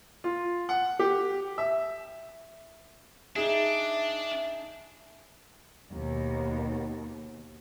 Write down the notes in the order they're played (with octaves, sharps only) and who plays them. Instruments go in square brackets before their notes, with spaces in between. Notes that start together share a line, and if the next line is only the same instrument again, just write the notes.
[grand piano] F4
F#5
G4
E5
[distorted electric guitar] D4 [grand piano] D#4 G#4 [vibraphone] E5
[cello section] D#2 B2